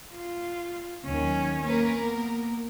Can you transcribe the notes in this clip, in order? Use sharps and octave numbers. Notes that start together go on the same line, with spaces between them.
F4
D#2 D#3 F#3 C#4
A#3 C#4 A#4 B4
B3